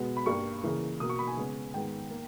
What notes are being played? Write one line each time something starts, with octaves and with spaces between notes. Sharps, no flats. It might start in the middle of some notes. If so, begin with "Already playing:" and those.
Already playing: B2 G#3 B3
B5
G2 G3 A#3 C#6
C#3 E3 A#3
B2 A#3 D#6
C#6
B5
G#5
C#3 G#3 B3
G#2 D#3 G#3 B3 G5
A#3